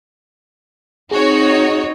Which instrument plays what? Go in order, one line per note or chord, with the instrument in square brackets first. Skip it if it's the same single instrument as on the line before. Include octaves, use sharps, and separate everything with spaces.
[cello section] C4 D#4 [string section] F#4 C#5 [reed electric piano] G#4